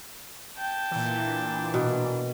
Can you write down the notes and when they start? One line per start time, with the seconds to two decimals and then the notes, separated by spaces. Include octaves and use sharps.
0.57 G5 A5
0.91 A#2 E3
1.25 D4
1.74 B2